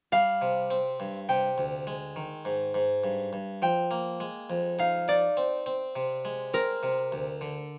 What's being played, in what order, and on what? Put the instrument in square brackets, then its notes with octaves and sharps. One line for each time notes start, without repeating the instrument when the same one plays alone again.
[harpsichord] G3 [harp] F5
[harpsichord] C3
C4
G2
[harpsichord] C3 [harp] G5
[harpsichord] D2
G#3
D#3
G#2
G#2
G2
G2
[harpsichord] F3 [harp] G5
[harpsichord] A#3
G#3
F2
[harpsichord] D#4 [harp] F5
[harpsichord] D#4 [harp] D5
[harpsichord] C4
C4
C3
G#3
[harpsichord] C4 [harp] A#4
[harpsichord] C3
D2
D3